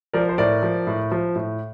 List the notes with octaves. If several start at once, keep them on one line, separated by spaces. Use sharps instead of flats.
F3 A#4 D5
C5
A2 A#4 D5
F3
A2
F3
A2